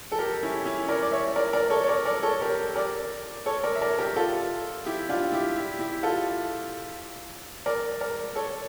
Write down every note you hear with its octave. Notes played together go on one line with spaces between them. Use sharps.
A4
G4 A#4
C#4 E4
C#4 E4
A#4 D5
D5
C#5 E5
A#4 D5
A#4 D5
A4 C#5
C#5
A#4 D5
A#4 D5
A4 C#5
G4 A#4
A#4 D5
A4 C#5
A#4 D5
E5
A#4 D5
G4 A#4
F4 A4
E4 G4
D4 F4
E4 G4
E4 G4
E4 G4
F4 A4
A#4 D5
A#4 D5
A4 C#5